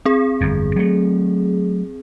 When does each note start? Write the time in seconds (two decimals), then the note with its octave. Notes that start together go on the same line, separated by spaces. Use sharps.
0.05 C4 G#4
0.41 G1 F2
0.76 F#3 A3